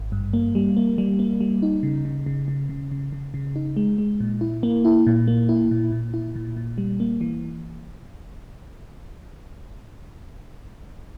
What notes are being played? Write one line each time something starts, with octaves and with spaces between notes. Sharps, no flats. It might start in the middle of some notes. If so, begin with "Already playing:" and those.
Already playing: G#1
G2
A#3
G3
A#3
G3
A#3
G3
D#4
C#3
C#3
C#3
C#3
C#3
C#3
C#3
C#3
D#4
G#3
G#3
A#2
E4
A#3
E4
A#2
A#3
E4
A#2
A#2
E4
A#2
A#2
G3
A#3
E3